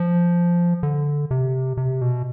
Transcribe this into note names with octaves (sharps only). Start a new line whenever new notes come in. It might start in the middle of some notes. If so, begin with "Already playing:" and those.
Already playing: F3
D3
C3
C3
B2